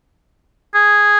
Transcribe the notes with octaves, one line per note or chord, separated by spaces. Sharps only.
G#4